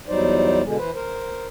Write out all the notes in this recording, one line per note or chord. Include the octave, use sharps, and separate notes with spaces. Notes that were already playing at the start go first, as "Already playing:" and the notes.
E2 F#3 G3 D#4 C5 D5
B2 D3 G#3
E3 B4 C5
A#4 C5